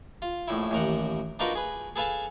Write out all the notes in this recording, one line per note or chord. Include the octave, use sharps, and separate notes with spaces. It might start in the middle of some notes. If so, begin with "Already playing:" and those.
F4
A#1 A2 E4
A1 D#2 A#4 F#5
D4 D#4 F4 F#4 A#4 B4
G#4 B4
G#4 A4 B4 F5 G#5 A5